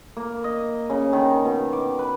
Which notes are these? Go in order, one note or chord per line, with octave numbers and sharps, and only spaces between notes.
A#3
D#5
C#3
D#3
B2
D6
B4